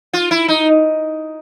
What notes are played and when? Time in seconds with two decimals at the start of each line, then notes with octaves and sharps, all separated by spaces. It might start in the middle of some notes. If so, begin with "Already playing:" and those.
0.13 F4
0.31 E4
0.48 D#4